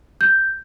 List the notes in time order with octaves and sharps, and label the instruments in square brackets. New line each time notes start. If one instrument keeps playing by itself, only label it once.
[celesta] G6